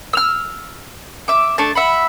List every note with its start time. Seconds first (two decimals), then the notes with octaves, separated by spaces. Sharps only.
0.13 E6 F6
1.28 E5 D6
1.58 A3 D4 A5
1.75 E5 F#5 B5